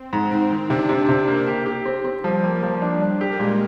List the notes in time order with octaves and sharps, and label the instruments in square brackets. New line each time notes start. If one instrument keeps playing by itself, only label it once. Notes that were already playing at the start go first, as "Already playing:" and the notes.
Already playing: [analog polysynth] C4
[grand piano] G#2
[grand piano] G#2 [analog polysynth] C4
[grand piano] D#3
[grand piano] C3 [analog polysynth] D4
[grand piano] C3
C3
A#3
G4
G4
C4
C4
[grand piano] F3 [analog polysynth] G3
[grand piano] A#3
[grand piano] F3 [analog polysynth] G3
[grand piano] D4
D4
G4
[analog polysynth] A#3
[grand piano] A#2 [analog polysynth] G#3